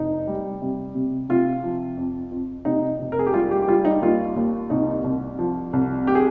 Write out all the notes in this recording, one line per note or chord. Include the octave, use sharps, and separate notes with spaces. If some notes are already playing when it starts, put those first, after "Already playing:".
Already playing: F1 D#4
G3
C3
C3
C3 F4
F3
F2
F2
C3 D#4
F1
A#4
G#4
G4
G3 F4
G4
G4
G3 F4
D#4
D#2 F4
D#2
C2 D#4
C2
F3
C2
G4
G#4